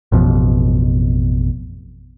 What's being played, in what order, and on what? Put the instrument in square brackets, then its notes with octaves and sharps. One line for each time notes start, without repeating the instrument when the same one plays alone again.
[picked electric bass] A1 F2 B2